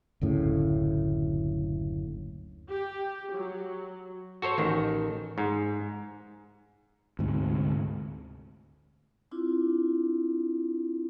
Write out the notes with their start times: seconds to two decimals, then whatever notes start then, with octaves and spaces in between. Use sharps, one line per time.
0.21 F#1 D2 A2 C#3
2.68 G4
3.33 F#3
4.42 F#4 A4 C5 C#5
4.58 A1 D#3
5.38 G#2
7.19 D2 G#2 C3
9.31 C4 D4 E4 F4